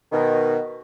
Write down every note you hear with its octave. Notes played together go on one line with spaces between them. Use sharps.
B2 D#3